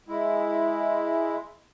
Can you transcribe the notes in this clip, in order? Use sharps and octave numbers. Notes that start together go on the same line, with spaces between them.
G#3 E4